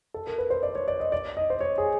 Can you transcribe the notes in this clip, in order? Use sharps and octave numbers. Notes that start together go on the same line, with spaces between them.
A4
A#4
B4
C5
D5
C#5
D5
D#5
D5
D#5
C5
C#5
G#4